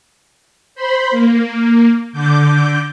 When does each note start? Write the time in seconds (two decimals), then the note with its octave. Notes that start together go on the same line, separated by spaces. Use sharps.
0.75 C5 B5 C6
1.11 A#3
2.12 D3 D6 G6